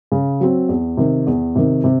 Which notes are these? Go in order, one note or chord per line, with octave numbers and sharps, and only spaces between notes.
C#3
F#3 C4
E2
C3 D#3
E2
C3 D#3
C3